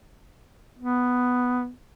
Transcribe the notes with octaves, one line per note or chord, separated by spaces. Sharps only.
B3